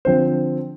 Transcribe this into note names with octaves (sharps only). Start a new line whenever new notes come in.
D3 F3 C4 C5